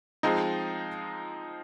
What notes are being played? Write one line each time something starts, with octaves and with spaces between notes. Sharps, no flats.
F3 G#3 C4 D#4